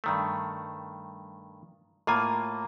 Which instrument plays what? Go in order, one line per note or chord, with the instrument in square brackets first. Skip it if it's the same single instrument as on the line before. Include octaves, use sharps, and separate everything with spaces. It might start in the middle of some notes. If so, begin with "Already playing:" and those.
[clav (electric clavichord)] G2 D#3 A3
[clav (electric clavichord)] A2 F4 G#5 [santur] A#3